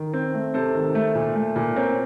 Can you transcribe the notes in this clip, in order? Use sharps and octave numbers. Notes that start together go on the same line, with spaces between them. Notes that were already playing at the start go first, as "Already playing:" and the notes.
Already playing: D#3
C4
A3
C3 A4 C5
D#3
A3
A#2
A3
A#2
C4 A#4 C#5